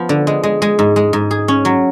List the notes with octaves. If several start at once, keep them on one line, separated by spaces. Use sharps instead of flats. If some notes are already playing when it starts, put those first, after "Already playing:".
Already playing: F3 B3
D3
G#3
G#3
G#3
G#2
G#3
G#2
G#4
C#4
F#3